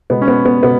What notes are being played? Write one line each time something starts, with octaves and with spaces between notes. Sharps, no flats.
B2 G#3 B3
C#4
B3
B3
B2 G#3 B3